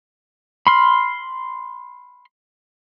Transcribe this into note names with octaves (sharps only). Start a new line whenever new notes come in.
B5 C6 F6